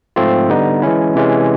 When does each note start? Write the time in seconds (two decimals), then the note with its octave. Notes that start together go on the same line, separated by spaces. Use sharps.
0.16 G#2 F3 A3 C4 F4
0.49 D3 G3 B3 D#4
0.82 E3 G#3 C#4 E4
1.15 C3 E3 G#3 C#4